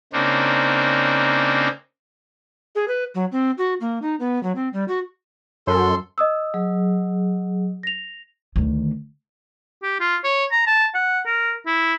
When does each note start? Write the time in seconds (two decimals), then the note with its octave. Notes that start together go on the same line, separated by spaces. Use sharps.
0.13 C#3 A#3 C4 D4 D#4
2.75 G#4
2.88 B4
3.15 F#3
3.32 C4
3.58 F#4
3.81 A#3
4.02 D#4
4.20 B3
4.43 F#3
4.56 C4
4.73 G3
4.88 F#4
5.67 F#2 A4 C6
6.18 D#5 D#6 E6
6.54 F#3 G#4
7.83 A#6 F7
8.56 D2 D#3
9.82 G4
10.00 F4
10.24 C#5
10.51 A#5
10.67 A5
10.94 F#5
11.26 A#4
11.66 E4